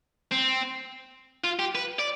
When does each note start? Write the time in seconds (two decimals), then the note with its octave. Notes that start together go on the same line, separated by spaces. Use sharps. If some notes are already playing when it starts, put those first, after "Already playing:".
0.31 C4
1.44 F4
1.59 G4
1.75 B4
1.99 D5